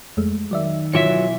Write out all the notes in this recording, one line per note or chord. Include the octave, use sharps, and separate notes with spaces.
F2 G#3 A3
D#3 F#3 D5 E5
B1 E3 F#3 F4 E5 B6 C#7